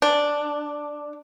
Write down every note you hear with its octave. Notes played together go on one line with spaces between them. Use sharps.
D4